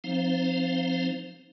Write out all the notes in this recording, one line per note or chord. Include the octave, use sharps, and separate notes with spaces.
F3 C4 D#4 C5 F5